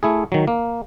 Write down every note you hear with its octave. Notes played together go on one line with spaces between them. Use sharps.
A3 E4 G#4
D#3 F#3
A#3